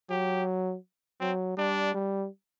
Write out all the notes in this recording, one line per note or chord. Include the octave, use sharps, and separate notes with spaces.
F#3 G4
F#3 C4
G3 D4
G3